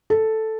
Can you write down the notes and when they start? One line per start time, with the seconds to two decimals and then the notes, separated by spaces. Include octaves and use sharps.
0.10 A4